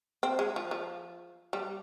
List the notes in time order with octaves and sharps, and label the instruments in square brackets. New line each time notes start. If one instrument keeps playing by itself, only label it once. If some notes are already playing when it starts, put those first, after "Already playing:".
[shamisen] C4
G#3
F3
F3
G3